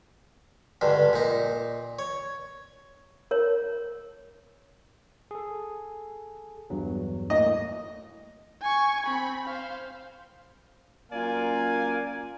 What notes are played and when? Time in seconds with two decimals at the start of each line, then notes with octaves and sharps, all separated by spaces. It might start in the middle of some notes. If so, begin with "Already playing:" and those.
0.81 C#2 G2 D3
1.13 A#2 D#4
1.99 C#5
3.31 A#4 C#5
5.31 G#4 A4
6.70 E2 G2 F#3
7.30 A2 A#3 D#5
8.62 G#5 C#6
9.06 C4 B5
9.45 C5 F5
11.11 F#2 A#3 F4 D5 F5 G#5